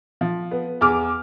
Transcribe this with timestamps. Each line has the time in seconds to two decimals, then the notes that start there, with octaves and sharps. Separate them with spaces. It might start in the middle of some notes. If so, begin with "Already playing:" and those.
0.21 F3
0.51 B3
0.81 E2 D6 F6